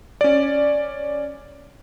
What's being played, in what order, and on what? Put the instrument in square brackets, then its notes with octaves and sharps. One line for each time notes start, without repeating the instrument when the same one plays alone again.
[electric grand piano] C#4 D5